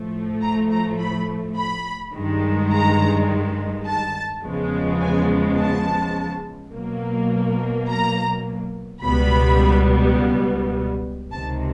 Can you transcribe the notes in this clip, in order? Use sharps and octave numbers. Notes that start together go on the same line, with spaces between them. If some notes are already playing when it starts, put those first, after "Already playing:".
Already playing: A2 F3 A3
A#5
A#5
B5
B5
G2 D#3 G#3
A#5
A5
E2 C#3 F3 G#3 B3
G#5
A5
B2 F#3 A#3
A#5
C#2 B2 G3 B3 B5
C#2 C3 D#3 A5